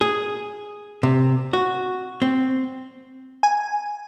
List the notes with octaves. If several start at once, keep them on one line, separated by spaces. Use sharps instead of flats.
G#4
C3
F#4
C4
G#5